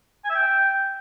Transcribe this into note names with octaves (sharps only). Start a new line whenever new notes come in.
G#5
E5
G5